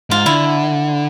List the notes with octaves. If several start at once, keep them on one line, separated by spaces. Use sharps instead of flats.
G#2 F4
D3 E4